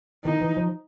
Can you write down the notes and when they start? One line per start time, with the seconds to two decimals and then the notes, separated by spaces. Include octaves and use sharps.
0.25 D#3 D#4
0.41 E3
0.57 F3